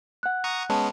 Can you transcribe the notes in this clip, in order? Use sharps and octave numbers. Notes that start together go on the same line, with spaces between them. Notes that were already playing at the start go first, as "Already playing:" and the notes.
F#5 F#6
A#5 C#6 D#6
G#3 B3 C#4 A5